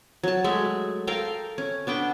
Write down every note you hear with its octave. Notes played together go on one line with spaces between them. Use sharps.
F#3 A5
F#3 G#3 A3 E5
A4 A#4 F5 G5
C#4
B3 D4 E5 G5